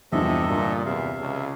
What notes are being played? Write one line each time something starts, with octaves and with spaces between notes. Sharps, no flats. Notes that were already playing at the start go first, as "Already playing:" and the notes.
E2 G2 C3 F3 A4 D#5 E5
G2 A#2 D3
E2 C3 E5 F5
C#2